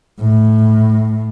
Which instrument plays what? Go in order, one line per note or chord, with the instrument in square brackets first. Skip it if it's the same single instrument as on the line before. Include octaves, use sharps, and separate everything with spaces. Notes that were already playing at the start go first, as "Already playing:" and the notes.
[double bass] A2